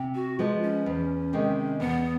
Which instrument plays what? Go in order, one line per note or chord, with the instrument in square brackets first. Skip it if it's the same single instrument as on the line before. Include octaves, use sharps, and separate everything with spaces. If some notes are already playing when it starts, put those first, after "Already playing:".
Already playing: [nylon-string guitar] C3
[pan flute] F#4
[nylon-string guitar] F3 G#3 B3 [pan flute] F4
[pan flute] C#4
[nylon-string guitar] E2
C3 D#3 G#3
[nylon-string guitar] E2 [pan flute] B3